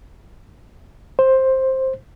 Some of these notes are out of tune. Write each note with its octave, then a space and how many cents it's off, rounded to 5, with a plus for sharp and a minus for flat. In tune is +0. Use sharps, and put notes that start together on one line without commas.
C5 +10